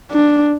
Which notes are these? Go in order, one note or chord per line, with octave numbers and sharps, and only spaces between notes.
D4